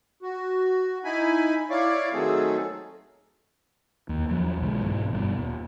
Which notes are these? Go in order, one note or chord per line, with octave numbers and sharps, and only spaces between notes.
F#4
D#4 E4 G#5 B5
E4 C#5 D5 F5 C#6 D6
D#3 F#3 A3 C4 G#4 A4
D#2
E2 F3 F#3
B1 D3 G#3
G#2 B2 E3
G1 G2 B2
D#1